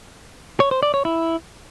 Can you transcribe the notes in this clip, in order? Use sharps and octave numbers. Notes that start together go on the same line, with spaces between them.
C#5
C5
D5
C#5
E4